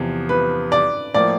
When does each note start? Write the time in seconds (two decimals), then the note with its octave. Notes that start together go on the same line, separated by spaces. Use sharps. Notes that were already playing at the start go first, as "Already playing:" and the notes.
Already playing: E2 C3 F3
0.29 B4
0.72 D5
1.14 A2 F3 A#3 D5